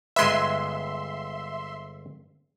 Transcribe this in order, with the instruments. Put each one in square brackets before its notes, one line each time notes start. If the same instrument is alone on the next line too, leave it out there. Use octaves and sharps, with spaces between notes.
[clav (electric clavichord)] G1 G#3 B4 [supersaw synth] E5 C6